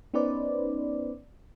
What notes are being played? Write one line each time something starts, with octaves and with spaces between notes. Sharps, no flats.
B3 C#4 D#4 B4 C5 D5